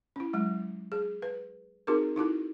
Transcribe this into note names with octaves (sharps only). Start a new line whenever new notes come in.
C#4 E4
F#3 G#3
G#4
B4
C4 D#4 F#4 G#4 A#4
D#4 E4 F#4 A4